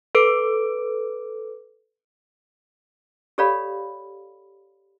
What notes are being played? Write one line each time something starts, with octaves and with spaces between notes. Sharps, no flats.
A4 B4 D6 D7
G4 A4 C#5 D5 F5 B5